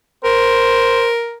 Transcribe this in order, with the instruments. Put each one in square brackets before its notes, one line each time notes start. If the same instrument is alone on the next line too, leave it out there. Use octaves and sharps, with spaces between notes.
[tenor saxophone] A#4 [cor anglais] C5